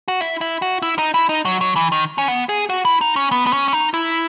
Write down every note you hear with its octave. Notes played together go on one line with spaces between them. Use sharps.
F#4
E4
E4
F#4
E4
D#4
E4
D#4
F#3
F#3
E3
D#3
C#4
B3
G#4
F#4
E4
D#4
C#4
B3
B3
C#4
C#4
D#4
E4